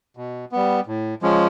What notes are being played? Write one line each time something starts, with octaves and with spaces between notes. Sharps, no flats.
B2
G3 B3
A2
F3 G#3 C#4